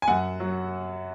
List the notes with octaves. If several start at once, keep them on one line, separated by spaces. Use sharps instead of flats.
G#5
F#2 F#5
F#3